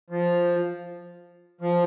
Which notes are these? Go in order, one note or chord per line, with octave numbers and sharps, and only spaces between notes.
F3
F3